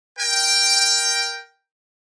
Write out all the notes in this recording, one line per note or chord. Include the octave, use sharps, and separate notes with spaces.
A#4 G5